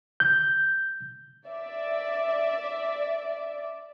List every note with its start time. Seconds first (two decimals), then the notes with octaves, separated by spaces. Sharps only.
0.20 G6
1.47 D5 E5